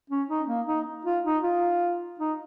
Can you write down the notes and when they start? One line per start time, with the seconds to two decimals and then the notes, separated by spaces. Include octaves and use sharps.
0.10 C#4
0.29 D#4
0.48 A#3
0.67 D#4
1.05 F4
1.25 D#4
1.43 F4
2.19 D#4